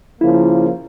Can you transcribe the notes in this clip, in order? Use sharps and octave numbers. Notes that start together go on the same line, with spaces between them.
C#3 F3 A#3 E4